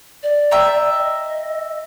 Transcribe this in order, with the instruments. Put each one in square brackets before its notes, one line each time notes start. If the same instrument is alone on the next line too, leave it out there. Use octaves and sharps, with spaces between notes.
[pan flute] D5
[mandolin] E5 G5 A#5
[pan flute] D#5